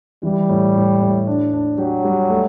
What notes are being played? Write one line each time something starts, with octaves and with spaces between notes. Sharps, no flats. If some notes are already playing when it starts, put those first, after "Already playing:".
E3 G3
A2
A2
A2
D4
D4
F#3 G4
G3
A3